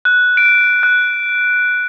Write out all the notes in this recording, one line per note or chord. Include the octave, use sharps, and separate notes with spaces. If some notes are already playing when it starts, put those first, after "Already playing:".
F#6
D7
F#6